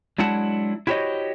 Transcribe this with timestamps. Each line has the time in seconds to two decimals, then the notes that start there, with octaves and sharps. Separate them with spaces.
0.18 F#3 G#3 D4 E4 F#5 A5
0.87 E4 F#4 G4 C5 C#5 D#5